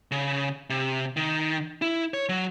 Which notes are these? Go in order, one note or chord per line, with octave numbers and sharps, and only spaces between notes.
C#3
C3
D#3
E4
C#5
F#3